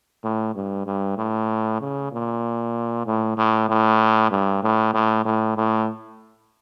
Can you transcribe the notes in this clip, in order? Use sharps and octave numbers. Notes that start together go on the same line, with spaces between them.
A2
G2
G2
A2
C#3
A#2
A2
A2
A2
G2
A2
A2
A2
A2